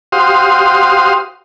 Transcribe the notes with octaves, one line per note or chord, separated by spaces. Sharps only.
F#4 G4 C5 F5 C6 D#6